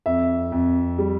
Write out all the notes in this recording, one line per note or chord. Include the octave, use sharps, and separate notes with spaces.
F2 E5
F2
G3